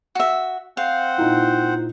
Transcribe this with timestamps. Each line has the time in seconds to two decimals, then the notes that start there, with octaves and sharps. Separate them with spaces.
0.15 F#4 E5
0.77 C4 C5 F5 F#5
1.18 A#2 D#4 E4